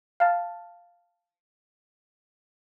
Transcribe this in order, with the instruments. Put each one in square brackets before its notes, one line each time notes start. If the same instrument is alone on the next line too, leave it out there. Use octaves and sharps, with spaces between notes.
[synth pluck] F5 A5